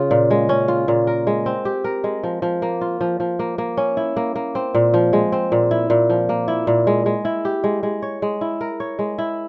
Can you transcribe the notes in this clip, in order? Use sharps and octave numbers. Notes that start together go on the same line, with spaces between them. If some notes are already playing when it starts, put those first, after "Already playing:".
Already playing: C#3 F4
A#2
G#3
C#4
F4
A#2
A#4
G#3
C4
G4
A#4
G#3
F3
F3
A#3
F4
F3
F3
A#3
A#3
C#4
E4
A#3
A#3
C4
A#2
F3
G#3
C4
A#2
E4
A#2
F3
A#3
E4
A#2
G#3
G#3
E4
G4
G#3
G#3
C#5
G#3
E4
A#4
C#5
G#3
E4